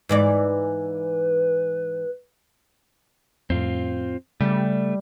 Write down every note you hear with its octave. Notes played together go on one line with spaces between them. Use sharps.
G#2 E3 B4 D5
F2 A2 C4 F4
C#3 G3 A3